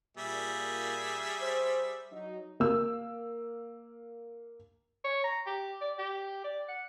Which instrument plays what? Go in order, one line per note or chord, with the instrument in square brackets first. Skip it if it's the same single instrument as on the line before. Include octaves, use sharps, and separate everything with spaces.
[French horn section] A#2 [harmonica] G3 G#4 E5
[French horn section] C5
F#3 D#4
[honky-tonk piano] A#3 E6
[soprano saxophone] C#5
A#5
G4
D5
G4
D5
F#5